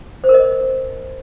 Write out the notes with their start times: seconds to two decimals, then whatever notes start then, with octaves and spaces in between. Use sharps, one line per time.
0.24 C5
0.29 A#4
0.34 D#5